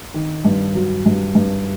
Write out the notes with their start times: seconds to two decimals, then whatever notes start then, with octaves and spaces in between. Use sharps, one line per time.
0.14 D#3
0.45 G2
0.75 F#3
1.06 G2
1.35 G2